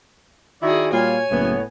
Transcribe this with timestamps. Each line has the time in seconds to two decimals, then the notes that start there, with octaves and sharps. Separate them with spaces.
0.63 D#3 E4 F#4 G#4 D5
0.92 A#2 G3 F4 C#5 G#5
1.31 F#1 A2 B3